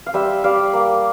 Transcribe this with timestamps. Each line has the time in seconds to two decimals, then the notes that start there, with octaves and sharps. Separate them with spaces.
0.06 F5
0.14 G3 C5 E5
0.44 G3 D5 F5
0.73 A#3